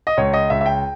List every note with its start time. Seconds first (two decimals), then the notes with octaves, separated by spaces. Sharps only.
0.07 D#5
0.17 C#2 C#5
0.33 D#5
0.50 C#2 E5
0.61 E5
0.66 G5